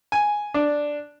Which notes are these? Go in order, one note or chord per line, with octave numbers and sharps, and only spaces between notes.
G#5
D4